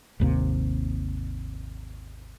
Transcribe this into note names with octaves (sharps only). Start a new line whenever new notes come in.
G#1 D#2 C3 A#3